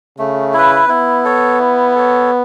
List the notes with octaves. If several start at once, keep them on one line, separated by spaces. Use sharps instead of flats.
C#3 A3
E4 B4
B3 E4
A4 C#5
E4
A4 C#5